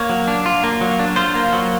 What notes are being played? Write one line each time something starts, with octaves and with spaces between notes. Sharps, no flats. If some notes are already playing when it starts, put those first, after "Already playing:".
Already playing: A#3 C#5
F#3
D4
F4
A#3
F#3
D4
F4 C5
A#3
F#3